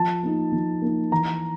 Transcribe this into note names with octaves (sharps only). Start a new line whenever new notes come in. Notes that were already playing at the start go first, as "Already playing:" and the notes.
Already playing: F3 A5
A#3 D#4
F3
A#3 D#4
E3 A#5